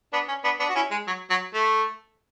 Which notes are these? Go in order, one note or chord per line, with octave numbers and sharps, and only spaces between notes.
B3 D4
C#4
B3 D4
B3 D4
F#4
C#4 E4
G#3
F#3
F#3
A3